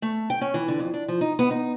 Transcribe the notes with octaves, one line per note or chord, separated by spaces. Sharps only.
A3
G5
C#4
E3
D3
F2
D4
F3
D#4
B3
D#4